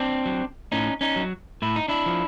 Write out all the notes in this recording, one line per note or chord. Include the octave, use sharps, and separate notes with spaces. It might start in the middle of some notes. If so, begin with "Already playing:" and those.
Already playing: C4 D4
F#3
A2 C#4 D#4
C#4 D#4
F#3
A2 E4
D#4
D4 E4
F3